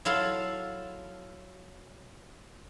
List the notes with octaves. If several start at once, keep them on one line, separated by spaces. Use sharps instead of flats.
F#3 E4 F4 A4 F5 A5